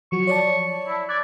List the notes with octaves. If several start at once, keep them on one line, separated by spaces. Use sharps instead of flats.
F3 F#3 F#4 C#6
C#5 D5 A5
E4
D5 F#6 G#6